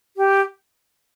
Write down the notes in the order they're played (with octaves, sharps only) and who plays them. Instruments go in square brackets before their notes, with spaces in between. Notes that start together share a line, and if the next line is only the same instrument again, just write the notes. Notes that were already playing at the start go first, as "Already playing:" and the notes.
[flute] G4